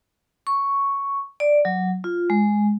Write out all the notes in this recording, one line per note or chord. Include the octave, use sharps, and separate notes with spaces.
C#6
D5
F#3
F4
G#3